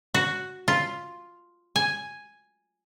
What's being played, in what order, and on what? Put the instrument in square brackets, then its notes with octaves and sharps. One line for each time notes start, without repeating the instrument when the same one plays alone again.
[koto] F#4
F4
G#5